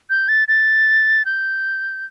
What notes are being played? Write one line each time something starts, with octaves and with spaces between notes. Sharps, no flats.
G6
A6
A6
G6